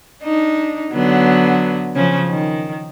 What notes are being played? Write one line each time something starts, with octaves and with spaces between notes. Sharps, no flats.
D4 D#4
D3 F#3 B3
C#3 F3 C#4
D#3